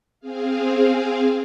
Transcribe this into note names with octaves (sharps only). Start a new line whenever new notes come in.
C4 G#4 F5